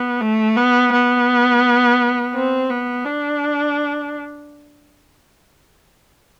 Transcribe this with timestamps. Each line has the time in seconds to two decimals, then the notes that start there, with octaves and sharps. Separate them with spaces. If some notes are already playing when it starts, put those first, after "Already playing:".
Already playing: B3
0.21 A3
0.57 B3
0.93 B3
2.35 C4
2.70 B3
3.05 D4